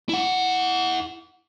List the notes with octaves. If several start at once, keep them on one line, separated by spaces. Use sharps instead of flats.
E4 F#5